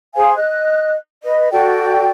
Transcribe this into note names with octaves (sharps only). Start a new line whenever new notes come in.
G#4 C5 F5 G#5
D#5 F#6
B4 D#5
F#4 A4 D5 G5